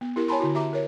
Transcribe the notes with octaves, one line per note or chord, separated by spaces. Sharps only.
B3
E4 G4 A#4
C#5 G#5 A5 B5 C6
D3 E4 F#4
G4 E5 A#5 D6
A#4 C#5